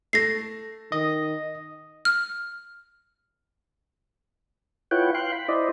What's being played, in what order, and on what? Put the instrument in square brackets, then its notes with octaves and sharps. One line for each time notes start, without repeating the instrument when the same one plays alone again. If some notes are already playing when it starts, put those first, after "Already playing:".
[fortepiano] A3 [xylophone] A#6 C7
[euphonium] D#3 [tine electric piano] D#5
[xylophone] F6
[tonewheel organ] E4 F4 B4 C#5 F#5 G5
F5 G5 C6 F#6
B5
E4 C5 D5 D#5